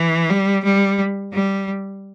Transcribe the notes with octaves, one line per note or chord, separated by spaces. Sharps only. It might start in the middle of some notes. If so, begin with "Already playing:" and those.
Already playing: E3
G3
G3
G3